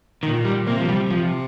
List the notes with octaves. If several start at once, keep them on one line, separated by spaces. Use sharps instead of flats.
A#2 D#3
G3
C3 A#3
F3
G3
C3 F3